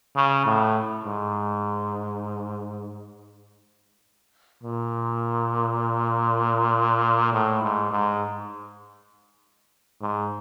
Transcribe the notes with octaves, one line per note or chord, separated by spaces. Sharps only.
C#3
A2
G#2
A#2
A2
G#2
G#2
G#2